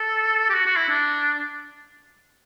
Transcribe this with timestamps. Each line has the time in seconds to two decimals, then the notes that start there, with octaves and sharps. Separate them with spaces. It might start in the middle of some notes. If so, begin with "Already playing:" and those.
Already playing: A4
0.49 G4
0.54 F#4
0.66 F#4
0.76 E4
0.89 D4